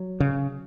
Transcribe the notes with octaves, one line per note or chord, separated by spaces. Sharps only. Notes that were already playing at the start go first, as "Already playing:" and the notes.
Already playing: F#3
C#3